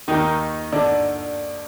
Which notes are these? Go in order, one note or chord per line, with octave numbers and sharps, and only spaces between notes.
D#2 D#3 D#4
D3 D4